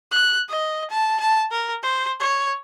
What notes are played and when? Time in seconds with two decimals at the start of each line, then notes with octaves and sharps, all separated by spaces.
0.12 F#6
0.49 D#5
0.90 A5
1.20 A5
1.51 A#4
1.83 C5
2.20 C#5